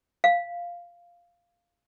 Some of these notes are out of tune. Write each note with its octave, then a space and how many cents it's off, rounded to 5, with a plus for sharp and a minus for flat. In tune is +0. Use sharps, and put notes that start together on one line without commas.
F5 -5